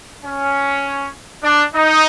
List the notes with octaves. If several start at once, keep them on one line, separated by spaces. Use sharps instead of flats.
C#4
D4
D#4